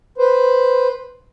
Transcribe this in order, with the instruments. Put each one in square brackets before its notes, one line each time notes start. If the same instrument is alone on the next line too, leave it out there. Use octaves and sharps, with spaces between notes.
[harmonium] B4 C5